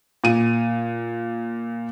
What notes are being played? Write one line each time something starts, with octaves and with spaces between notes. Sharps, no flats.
A#2 D#7